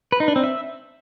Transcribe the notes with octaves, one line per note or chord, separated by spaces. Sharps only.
B4
D#4
D4
C4
E5